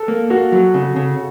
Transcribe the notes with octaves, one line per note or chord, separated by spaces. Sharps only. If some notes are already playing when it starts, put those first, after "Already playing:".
Already playing: A4
A#3
A#3 F#4
F#3
C#3
C#3